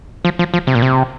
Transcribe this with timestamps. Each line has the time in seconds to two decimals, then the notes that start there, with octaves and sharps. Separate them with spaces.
0.25 F3
0.39 F3
0.54 F3
0.67 C3
0.75 A#2
0.82 C3